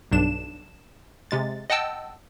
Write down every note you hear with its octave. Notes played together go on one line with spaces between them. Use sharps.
B1 G2 D4 E7
C3 G#3 A6
D#5 F#5 G5 A5 E6